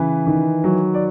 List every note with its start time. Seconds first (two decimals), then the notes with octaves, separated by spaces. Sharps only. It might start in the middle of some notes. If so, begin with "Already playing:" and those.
Already playing: C#3 E3 B4
0.27 D#3
0.64 F#3
0.94 D5